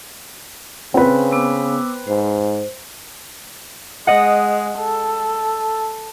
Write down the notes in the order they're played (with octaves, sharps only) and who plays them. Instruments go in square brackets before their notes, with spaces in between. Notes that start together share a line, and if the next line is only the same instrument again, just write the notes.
[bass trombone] C#3 [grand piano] C4 B4
[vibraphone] B3 D6 E6
[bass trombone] G#2 [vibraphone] C5
[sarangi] G#3 [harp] D#5 F#5
[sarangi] A4